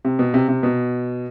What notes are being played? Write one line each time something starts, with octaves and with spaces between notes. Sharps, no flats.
C3
B2
C3
C3
B2